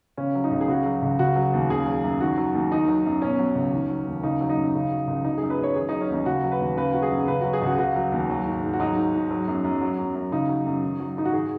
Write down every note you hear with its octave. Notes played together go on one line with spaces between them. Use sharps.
C#3 C#4
F#3
D#4
C#2
G#4
C#3 F#4
F#3
C#2
C#3 F#4
F#3
D#2
C#3 G#4
F#3
F#2
D#3 F#4
F#3
D#2
D#3 D#4
F#3
F#2
B2 C#4
F#3
C#2
D#3
F#3
D#2
C#3 D#4
F#3
D#4
F#2
C#3
F#3
C#2
F#3 D#4
G#4
F#2
B4
F#2 C#5
D#3 G#4
F#3 D#4
C#4
D#2 D#4
C#3 F#4
F#3
B4
D#2
C#3 B4
F#3 F#4
G#4
F#2
C#3 B4
F#3 F#4
G#4
C#2 F#4
C#3 F#4
F#3
D#2
F#3
G#2
G#2
F#4
F#3 D#4
G#2
G#2
F#3
F#2
F#2
F#3
F#2
F#2
C#3 D#4
F#3
F#2
D#3
F#3
G#2 D#4
F#4
D#3 G#4